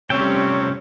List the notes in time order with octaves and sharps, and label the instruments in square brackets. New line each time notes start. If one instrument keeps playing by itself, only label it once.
[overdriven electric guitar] C3 A3 [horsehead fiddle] G3 C4 [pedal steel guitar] C#4 E5 G5 [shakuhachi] C#5